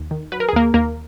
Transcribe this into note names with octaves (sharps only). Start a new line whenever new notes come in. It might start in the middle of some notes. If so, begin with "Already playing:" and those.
Already playing: D#2
D#3
F#3 B4
A#4
G#4
D#2 A#3 A#4
D#2 A#3 A#4